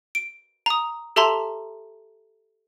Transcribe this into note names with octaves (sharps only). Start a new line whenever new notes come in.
D7
A#5 D#6
G4 A4 E5 A5 A#5 C6